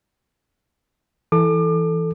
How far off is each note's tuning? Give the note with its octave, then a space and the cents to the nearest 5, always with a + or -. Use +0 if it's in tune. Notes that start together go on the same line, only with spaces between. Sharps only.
E3 +0 A4 +0 D6 +35